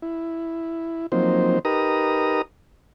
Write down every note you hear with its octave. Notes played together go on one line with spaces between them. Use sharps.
E4
F3 F#3 A#3 C4 D#4 C5
D#4 G4 A#4 B4 A#5 D#6